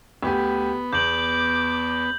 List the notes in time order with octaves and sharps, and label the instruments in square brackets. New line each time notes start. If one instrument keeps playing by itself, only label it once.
[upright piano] D2 G4 G#5 [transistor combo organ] B3
[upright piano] E2 [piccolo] D6 [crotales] G6 F#7